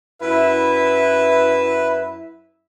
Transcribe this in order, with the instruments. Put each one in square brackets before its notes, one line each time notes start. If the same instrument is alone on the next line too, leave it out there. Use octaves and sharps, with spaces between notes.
[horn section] F#2 E4 E5 [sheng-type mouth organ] B4